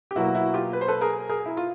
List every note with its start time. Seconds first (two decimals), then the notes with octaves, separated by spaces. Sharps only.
0.11 G4
0.16 B2 F#3 A#3 E4 F#4
0.35 E4 F#4
0.54 F4 G4
0.73 B4
0.81 C5
0.88 A4 B4
1.01 G#4 A#4
1.29 G#4 A#4
1.46 E4
1.57 F4